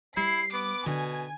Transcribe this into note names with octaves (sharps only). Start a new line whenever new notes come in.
G3 E4 C7
B3 D6
B2 D3 G#5